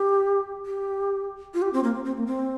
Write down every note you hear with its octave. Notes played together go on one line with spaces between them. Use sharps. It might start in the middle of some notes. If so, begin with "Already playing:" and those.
Already playing: G4
G4
F4
G4
C4
A#3
C4
C4
A#3
C4